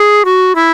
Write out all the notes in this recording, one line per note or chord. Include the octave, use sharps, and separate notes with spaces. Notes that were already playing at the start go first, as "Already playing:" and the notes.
Already playing: G#4
F#4
E4